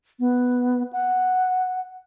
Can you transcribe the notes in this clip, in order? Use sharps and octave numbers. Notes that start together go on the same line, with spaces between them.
B3
F#5